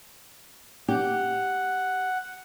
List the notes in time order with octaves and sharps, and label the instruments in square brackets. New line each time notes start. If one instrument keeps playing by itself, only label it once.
[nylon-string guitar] G4 [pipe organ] F#5